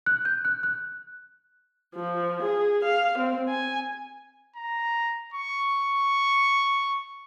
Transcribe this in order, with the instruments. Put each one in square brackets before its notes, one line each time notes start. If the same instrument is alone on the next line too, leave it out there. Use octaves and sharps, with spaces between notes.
[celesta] F#6
G6
F#6
F#6
[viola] F3
G#4
F5
C4
G#5
[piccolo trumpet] A#5
C#6